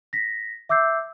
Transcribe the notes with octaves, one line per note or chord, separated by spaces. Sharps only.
A#6 B6
E5 D6 E6 G6 C7